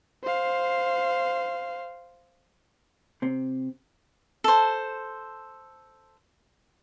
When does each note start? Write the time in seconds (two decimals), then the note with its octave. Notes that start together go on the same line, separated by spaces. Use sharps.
0.23 C5 F5
3.22 C3 C4
4.44 A4 C5